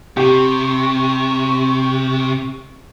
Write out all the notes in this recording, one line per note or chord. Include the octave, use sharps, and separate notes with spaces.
C3 G4 C#6